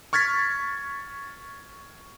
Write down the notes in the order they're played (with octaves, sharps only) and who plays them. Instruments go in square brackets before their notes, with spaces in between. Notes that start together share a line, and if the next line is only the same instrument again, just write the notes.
[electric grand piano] C#6 F6 G#6 A6 B6